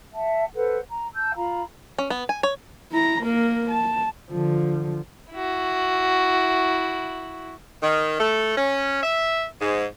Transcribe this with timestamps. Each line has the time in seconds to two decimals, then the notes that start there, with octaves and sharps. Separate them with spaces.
0.12 E5 F#5 A5
0.53 A4 B4 C5 F#5
0.88 A#5
1.13 A5 E6 G6
1.35 F4 F5 A#5 B5
1.98 C#4
2.10 B3
2.29 G#5
2.43 C#5
2.91 E4 A#5
3.22 A#3 A#4
3.70 A5
4.31 D3 F3
5.32 E4 F#4
7.82 D#3
8.19 A3
8.57 C#4
9.03 E5
9.60 G#2